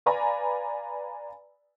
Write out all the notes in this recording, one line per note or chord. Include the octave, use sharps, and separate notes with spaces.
B4 D5 F5 G#5 A#5 B5